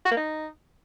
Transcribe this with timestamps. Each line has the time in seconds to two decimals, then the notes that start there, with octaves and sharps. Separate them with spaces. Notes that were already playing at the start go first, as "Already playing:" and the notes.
0.05 F#4
0.11 A#3
0.17 D#4